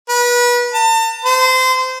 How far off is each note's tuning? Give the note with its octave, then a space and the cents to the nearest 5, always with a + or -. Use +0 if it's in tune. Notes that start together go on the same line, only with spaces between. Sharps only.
B4 -30
A5 +35
C5 -25